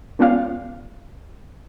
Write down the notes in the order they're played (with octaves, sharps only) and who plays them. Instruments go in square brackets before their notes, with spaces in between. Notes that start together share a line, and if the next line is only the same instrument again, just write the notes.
[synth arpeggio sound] G#3 B3 C#4 F4 D5 F5